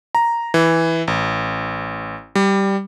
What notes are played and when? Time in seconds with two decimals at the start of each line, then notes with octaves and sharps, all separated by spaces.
0.15 A#5
0.54 E3
1.08 A1
2.35 G3